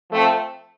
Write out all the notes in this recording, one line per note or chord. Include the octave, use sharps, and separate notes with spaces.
F3 A3 C4